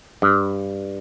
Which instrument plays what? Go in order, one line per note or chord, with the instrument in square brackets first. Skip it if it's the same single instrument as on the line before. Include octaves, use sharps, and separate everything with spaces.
[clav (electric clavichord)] G2